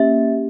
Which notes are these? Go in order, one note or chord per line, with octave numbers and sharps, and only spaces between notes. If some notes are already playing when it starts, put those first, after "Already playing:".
Already playing: A#3 C#4 G4 E5